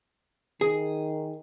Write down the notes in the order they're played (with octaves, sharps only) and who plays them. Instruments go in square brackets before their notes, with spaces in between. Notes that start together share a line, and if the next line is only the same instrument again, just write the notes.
[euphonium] D#3 [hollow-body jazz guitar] G#4